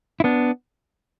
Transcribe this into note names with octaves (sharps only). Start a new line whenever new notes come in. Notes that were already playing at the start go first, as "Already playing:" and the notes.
E4
B3 D4